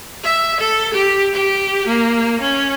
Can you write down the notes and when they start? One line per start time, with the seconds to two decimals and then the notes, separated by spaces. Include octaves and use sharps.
0.23 E5
0.60 A4
0.94 G4
1.33 G4
1.87 A#3
2.41 C#4